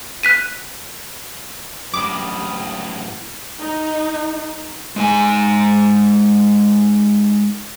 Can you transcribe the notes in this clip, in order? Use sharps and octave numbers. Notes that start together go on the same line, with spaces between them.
F#6 B6 D#7
F#2 A2 G3 D6 D#6
D#4
G#3 D#4 G#5